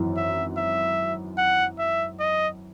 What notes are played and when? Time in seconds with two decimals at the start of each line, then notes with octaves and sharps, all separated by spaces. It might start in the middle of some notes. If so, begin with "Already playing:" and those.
Already playing: G#1 F#2 E3
0.17 E5
0.57 E5
1.38 F#5
1.79 E5
2.20 D#5